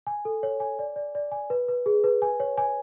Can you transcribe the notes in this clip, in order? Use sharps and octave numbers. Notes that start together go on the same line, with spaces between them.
G#5
A4
C#5
G#5
D5
D5
D5
G#5
B4
B4
G#4
B4
G#5
C#5
G#5